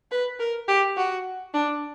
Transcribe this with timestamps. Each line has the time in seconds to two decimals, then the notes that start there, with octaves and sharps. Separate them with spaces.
0.11 B4
0.40 A#4
0.68 G4
0.97 F#4
1.54 D4